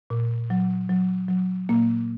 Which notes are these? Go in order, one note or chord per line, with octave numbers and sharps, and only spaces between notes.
A#2
F#3
F#3
F#3
A#2 A#3